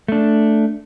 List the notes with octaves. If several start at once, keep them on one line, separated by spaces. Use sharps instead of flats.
A3 D4